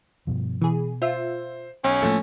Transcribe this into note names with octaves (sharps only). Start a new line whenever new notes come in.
G2 B2 F3
B2 E3 G#4
F4 C5 E5
B1 C#4
A2 F3 A3 A#3 C4 A4